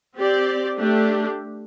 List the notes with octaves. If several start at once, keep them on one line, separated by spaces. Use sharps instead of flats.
C4 G4 D5
A3 D4 G4